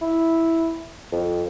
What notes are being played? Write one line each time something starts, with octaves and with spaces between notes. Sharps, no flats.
E4
F2